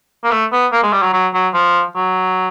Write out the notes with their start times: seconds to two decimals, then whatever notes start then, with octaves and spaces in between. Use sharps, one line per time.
0.24 A#3
0.31 A3
0.52 B3
0.72 A#3
0.83 G#3
0.93 G3
1.03 F#3
1.13 F#3
1.34 F#3
1.54 F3
1.96 F#3